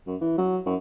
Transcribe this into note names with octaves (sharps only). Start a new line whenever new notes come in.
F#2
E3
F#3
F#2